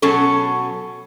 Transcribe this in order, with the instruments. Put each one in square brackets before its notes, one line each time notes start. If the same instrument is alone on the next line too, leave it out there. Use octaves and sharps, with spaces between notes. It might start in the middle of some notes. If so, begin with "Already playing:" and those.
[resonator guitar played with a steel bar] B2 F#3 C#4 A4